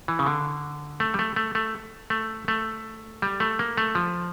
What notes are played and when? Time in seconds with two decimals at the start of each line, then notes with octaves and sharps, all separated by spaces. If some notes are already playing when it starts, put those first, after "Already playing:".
0.08 E3
0.19 C#3
0.27 D3
1.00 A3
1.14 G3
1.19 A3
1.36 A3
1.55 A3
2.10 A3
2.48 A3
3.22 G3
3.40 A3
3.59 A#3
3.77 A3
3.95 F3